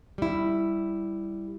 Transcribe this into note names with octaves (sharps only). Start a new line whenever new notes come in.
G3 E4